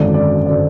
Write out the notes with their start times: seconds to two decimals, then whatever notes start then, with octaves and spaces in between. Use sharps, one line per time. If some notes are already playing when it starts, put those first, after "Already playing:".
Already playing: G#1 F#2 D3 D5
0.14 D5
0.46 D3 D5